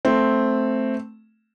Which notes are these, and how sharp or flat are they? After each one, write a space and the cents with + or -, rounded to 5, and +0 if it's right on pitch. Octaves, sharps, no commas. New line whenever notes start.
A3 +0 C4 +0